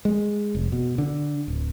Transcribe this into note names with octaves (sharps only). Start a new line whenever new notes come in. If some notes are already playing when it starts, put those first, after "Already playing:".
G#3
F1
B2
D3
D1